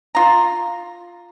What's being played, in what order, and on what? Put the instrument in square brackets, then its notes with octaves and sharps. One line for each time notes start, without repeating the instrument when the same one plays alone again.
[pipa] F4 A#5